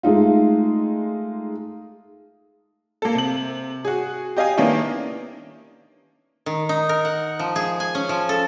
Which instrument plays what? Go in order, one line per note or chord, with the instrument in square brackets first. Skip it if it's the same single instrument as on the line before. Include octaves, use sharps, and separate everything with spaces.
[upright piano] G#3 A3 D#4 F4
[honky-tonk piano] A#3 A4
C3 F#7
F#4 G#4
G4 D#5 F5 G#5
D#3 A#3 B3 C#4 D4 E4
[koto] D#3
D#4
A#4
F#5
F3
G#4
G#5
C#4
F3
A4